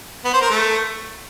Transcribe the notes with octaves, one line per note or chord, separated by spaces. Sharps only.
B3
C5
A#4
A3